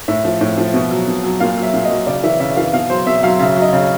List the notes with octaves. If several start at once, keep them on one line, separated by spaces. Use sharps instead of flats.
A2 E5
F3
A2
F3
B2
F#3
B2
F#3
A#2 F5
F#3
E5
A#2
D#5
F#3
C#3 D5
E3 E5
C#3 E5
E3 F5
B2 F5
F#3 C5
B2 E5
F#3 F5
C#3 E5
F#3
D#5
C#3